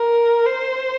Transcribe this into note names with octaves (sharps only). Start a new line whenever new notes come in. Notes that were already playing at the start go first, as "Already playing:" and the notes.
Already playing: A#4
C5